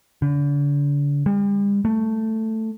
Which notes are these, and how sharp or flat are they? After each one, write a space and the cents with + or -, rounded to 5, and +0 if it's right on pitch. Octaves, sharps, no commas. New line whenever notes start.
D3 -40
G3 +40
A3 +10